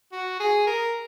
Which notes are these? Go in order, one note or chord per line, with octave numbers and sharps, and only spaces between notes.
F#4
G#4
A#4